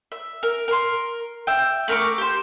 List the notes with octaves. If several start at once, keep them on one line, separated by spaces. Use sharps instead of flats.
E5
A#4
A#4 C6
E5 G5
A3 A#4 C#6 D6
G4 C5